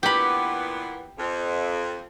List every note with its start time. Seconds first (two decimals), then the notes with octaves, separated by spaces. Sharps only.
0.03 A#2 E3 B3 G4 B5
1.18 F2